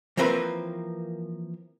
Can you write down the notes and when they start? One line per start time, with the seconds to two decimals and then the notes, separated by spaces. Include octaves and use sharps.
0.17 E3 F3 A#3 C4 A#4 B4